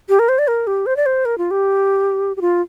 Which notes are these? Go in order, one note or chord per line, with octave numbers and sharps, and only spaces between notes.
G4
A#4
C5
D5
A#4
G4
C5
D5
C5
A#4
F4
G4
G4
F4